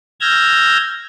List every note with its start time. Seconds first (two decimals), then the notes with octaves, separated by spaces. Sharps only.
0.21 E6 F6 G6 G#6 A#6